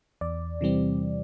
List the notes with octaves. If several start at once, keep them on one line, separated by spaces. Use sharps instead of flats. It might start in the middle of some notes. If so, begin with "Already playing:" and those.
E2 D5
C3 E3 G3 C4